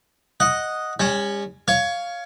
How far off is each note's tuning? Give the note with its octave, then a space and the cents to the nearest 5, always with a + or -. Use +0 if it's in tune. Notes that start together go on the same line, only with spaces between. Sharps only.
D#5 +0 F#5 -5
G3 +45 C#4 +0
C#5 +15 F5 +0